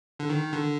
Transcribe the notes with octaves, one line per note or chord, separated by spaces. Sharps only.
D3
D#3
D3